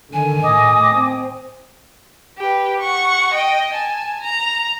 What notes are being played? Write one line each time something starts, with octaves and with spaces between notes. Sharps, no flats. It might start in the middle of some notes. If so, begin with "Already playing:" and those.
D3 D#3 G#5
A2 D#5 D6 D#6
C4
G4 B4
F#5 C#6
D#5 G5
G#5 A5
A#5